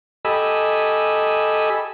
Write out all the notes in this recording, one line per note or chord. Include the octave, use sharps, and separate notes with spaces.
G4 A4 D#5 G#5 B5 E6